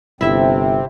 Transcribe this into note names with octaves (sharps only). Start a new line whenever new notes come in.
G1 C3 C4 E4 E5